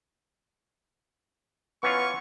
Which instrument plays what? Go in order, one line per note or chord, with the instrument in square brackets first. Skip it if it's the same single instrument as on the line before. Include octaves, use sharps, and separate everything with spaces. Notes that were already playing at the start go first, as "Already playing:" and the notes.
[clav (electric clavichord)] E3 C#4 F4 [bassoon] B3 [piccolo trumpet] C#6